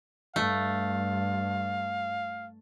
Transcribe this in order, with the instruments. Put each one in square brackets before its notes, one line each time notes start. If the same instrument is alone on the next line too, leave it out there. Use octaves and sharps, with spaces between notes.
[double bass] G2 [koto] A3 [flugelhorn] F5